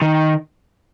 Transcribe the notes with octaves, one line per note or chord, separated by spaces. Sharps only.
D#3